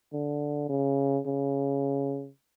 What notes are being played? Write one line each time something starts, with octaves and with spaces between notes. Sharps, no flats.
D3
C#3
C#3